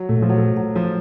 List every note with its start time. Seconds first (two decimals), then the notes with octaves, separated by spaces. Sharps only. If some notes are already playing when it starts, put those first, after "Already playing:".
Already playing: F#3
0.09 A#2 A3
0.16 F#3
0.22 F3
0.30 F#3
0.37 A3
0.57 F#3
0.76 F3